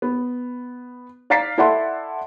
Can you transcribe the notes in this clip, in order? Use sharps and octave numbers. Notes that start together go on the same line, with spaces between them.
B3
D5 F5 A#5 A6 B6 C7
E4 A4 D5 F#5 A5 C6